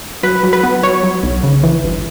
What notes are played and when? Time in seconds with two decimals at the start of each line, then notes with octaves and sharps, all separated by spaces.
0.23 F#3 B4
0.43 F#3
0.53 B4
0.63 B3
0.83 F#3 C#5
1.03 F#3
1.23 B1
1.43 C#3
1.63 E3
1.84 G1